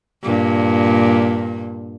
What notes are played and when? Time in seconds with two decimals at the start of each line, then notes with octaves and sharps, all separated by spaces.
0.23 G2 A#2